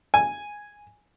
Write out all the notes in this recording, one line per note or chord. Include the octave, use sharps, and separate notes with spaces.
G#5